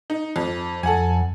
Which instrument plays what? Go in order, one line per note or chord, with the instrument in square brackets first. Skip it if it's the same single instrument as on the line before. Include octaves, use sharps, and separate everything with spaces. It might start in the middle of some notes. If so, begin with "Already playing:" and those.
[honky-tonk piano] D#4
F2
[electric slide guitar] F2 F#5 [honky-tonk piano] A4 G#5